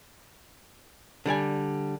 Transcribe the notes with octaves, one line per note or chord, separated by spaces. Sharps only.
D3 G3 D5 G#5